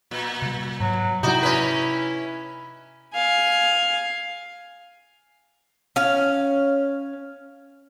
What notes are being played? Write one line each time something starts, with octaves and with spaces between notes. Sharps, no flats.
A#2
C3 G3
G#2 F#3
C3 D#4 E4 F#4 D5 G5
C#4 B4
F5 G#5
C#4 F5